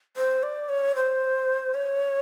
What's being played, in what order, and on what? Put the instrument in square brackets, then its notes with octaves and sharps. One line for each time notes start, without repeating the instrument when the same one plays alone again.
[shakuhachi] C5
D5
C#5
C5
C#5